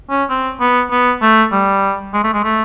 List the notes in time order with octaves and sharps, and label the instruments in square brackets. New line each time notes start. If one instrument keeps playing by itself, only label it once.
[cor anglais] C#4
C4
B3
B3
A3
G3
G#3
A3
G#3
A3